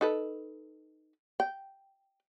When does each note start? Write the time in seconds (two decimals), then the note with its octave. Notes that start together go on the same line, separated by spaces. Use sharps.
0.01 D#4 A4 B4
1.40 G5